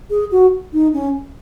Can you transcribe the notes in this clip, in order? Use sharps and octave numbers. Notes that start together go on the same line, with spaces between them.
G#4
F#4
D#4
C#4